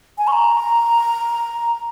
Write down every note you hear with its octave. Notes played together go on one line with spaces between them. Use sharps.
G#5
C#6
A#5